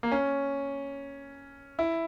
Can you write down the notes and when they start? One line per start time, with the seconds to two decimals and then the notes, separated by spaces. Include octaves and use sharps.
0.03 A#3
0.12 C#4
1.79 E4